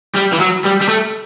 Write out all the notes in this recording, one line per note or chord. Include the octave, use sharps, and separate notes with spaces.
G3
E3
F#3
G3
G3
A3